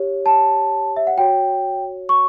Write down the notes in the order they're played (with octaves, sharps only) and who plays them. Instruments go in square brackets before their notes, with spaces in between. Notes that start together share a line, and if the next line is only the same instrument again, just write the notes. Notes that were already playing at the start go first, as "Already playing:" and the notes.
Already playing: [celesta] G4 C#5
A5
E5
F#5
F#4 C#5 G5
C#6